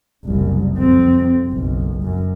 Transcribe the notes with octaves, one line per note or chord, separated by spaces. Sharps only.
F#1 C2
F2 C4
F#1 B1
F#2